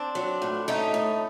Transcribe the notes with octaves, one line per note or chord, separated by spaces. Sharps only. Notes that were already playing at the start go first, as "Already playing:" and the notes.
Already playing: C4 D4
F#3
A2
A3 C#4 D#4
A2